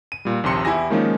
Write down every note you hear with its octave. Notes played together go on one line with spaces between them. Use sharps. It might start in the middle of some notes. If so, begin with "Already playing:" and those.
D#7
A#2 G3
A#1 D#2 C3 C6 C#7
E2 E4 G4 G#5 A#6
D#3 F3 G#3 A#3 C#4 D#4